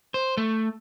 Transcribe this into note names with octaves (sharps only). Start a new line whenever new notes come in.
C5
A3